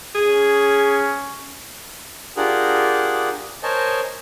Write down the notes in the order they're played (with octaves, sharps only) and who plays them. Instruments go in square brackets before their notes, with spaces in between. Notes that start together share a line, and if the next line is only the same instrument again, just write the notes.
[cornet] C#4 [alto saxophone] G#4
[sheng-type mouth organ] D4 F4 G4 G#4 A#4 F#5
A#4 C5 C#5 D#5 G#5 A5